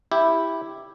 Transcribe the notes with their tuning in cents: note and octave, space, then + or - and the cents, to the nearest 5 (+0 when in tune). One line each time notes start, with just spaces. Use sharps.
E4 +0 G4 +0